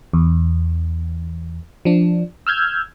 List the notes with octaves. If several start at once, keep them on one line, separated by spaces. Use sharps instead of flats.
E2
F3 D4
E6 F6 G6 G#6